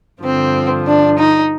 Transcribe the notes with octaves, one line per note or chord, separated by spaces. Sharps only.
G2 D3 F3 C4
D4
D#4